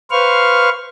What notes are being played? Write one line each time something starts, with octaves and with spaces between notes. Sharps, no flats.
B4 C5 F5 C#6 F6